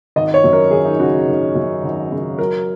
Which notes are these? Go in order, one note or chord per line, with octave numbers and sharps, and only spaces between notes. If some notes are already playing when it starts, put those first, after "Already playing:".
G#1 D#5
C#5
F#2
A#4
G#1 G#4
D#4
C#3 F#4
G#1
F#2
G#1
C#3
F#3 A#4